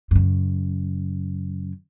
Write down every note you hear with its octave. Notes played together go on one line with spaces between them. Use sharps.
F#2 C#3